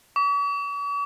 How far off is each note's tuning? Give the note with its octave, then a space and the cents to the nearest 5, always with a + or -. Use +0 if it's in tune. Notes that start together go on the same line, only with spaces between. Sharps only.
C#6 +45